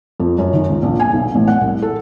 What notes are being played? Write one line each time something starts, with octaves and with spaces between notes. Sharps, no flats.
F2
F#2
D#3
C#2
A#1
G#5
B1
A1
F#5
C2
A4